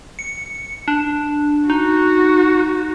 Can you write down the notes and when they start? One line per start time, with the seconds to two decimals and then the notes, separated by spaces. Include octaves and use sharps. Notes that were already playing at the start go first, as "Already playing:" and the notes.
0.19 C#7
0.88 D4
1.70 D#4 F#4